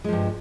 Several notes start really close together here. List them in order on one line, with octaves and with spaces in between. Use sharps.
G#3 F3 G2